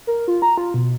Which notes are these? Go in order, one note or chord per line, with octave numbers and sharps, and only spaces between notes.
A#4
F4
A#5
F4
B2